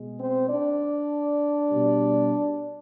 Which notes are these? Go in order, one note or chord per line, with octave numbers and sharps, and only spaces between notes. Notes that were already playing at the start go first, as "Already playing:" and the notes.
Already playing: B2 G#3
C4 C5
D4 D5
B2 G3